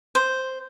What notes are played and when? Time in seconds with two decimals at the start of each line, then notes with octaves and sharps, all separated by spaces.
0.15 C5